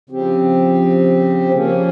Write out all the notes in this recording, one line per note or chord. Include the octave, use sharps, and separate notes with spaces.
C#3 F3 C4 G4
F3 A#3 C#4